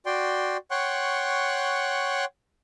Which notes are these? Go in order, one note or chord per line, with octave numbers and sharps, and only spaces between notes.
F#4 D5 G5 C6
C#5 F#5 G5 C6 C#6 F#6